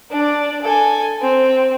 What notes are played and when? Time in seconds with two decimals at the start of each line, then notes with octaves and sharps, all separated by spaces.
0.11 D4 D5
0.63 A4 G#5
1.22 C4